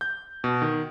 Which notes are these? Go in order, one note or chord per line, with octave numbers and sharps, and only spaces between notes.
G6
B2
D#3